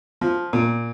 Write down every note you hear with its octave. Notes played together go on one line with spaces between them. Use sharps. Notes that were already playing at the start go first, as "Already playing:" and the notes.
F3
A#2